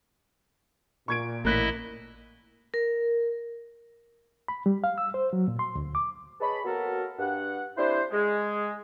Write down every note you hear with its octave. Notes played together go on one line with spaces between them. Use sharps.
A#2 C#6 G#6 D7
A1 A2 A#3 E4 D#5 F#6 B6
A#4
B5
G3
F5
E6
C5
F#3
A#2
C6
D2
D6
G#4 B4 C#5 D#5 A5 B5
F#3 A#3 B3 F#4 A4 A#4
G2 F#5
G3 C4 D4 E4 B4 C5
G#3